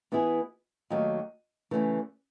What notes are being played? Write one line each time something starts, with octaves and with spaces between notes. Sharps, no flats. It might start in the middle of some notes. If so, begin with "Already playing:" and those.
E3 B3 E4 G#4
D#2 D#3 F#3 A3
E2 C#3 E3 A3